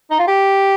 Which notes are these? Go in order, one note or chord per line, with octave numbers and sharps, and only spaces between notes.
D#4
F4
G4